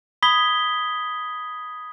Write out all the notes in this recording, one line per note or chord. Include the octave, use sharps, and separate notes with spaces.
B5 D#6 G#6 B6 G7